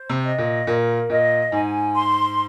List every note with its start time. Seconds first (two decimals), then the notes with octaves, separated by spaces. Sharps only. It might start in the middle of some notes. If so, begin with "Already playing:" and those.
Already playing: C5
0.10 C3
0.24 D#5
0.38 A#2
0.67 A#2 A#4
1.10 A#2 D#5
1.52 G#2 G#5
1.95 C6